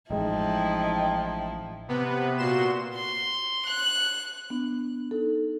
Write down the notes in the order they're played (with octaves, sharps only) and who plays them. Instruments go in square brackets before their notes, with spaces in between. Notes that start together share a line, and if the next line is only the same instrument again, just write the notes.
[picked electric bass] A1 G#3 [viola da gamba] F3 E4 [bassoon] D#4 [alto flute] G5
[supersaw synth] C3 B3 B4
A#2 F#4 C6 E7
[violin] C6
F#6
[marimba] B3 D4
D#4 A4